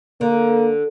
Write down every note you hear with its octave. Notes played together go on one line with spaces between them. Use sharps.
D3 A#3